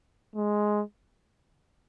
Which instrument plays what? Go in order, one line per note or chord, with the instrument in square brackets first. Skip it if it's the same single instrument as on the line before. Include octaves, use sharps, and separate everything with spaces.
[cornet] G#3